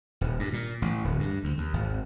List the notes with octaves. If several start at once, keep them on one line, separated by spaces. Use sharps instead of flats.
D#1
G2
A#2
A1
D1
G2
D2
D#2
G#1